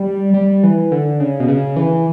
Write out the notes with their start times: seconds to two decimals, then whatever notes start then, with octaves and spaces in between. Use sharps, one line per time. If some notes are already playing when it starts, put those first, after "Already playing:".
Already playing: G3
0.34 G3
0.63 E3
0.92 D3
1.20 C#3
1.40 B2
1.48 C#3
1.77 E3